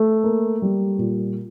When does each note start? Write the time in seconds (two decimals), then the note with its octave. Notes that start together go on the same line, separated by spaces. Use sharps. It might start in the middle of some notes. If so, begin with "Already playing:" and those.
Already playing: A3
0.24 A#3
0.62 G3
0.98 A#2